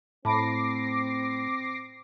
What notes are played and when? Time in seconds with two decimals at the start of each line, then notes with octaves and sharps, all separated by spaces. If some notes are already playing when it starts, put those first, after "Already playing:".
0.25 A2 C4 A5 B5 D6 A#6 C7